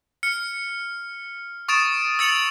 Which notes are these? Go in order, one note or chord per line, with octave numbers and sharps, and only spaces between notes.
F6 C#7
C#6 D#6 A6 D7 E7
E6 A6 C#7 F7 F#7